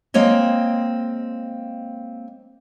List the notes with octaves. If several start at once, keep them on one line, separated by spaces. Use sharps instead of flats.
G#3 A#3 C4 C#5 D#5